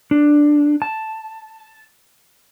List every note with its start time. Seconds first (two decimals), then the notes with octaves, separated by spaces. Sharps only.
0.11 D4
0.82 A5